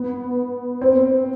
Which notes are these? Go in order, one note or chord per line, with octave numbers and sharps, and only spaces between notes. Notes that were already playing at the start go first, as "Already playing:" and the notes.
Already playing: B3
C4